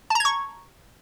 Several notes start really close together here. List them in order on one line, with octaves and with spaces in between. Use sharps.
A5 A#5 G#6 C#6